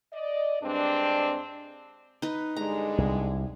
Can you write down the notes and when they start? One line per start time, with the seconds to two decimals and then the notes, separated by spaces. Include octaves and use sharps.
0.13 D5 D#5
0.62 G2 G#3 C4 D4
2.22 D#4 B4
2.57 G2 D3 G#3 A#5
2.98 C2